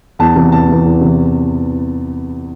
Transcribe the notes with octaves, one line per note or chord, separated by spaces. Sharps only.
E2 A5
C3 E3
E2 A5
C3 E3
E2
C3 E3